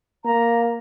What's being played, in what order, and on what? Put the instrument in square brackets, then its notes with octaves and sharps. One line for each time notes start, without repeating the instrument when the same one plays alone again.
[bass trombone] A#3 [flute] A#5